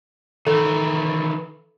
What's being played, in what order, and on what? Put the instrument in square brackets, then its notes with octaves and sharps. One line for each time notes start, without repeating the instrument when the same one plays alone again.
[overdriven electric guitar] D#3 E3 [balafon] A4